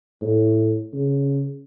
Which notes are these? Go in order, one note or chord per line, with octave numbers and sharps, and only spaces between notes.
A2
C#3